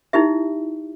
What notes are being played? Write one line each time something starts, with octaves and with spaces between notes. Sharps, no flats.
D#4 E4 G4 E5